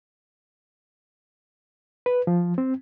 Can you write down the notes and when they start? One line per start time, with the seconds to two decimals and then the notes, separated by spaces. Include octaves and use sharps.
2.06 B4
2.27 F3
2.58 C4